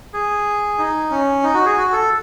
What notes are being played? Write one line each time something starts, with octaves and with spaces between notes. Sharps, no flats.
G#4
D#4
C#4
D#4
F#4
G#4
F#4
A4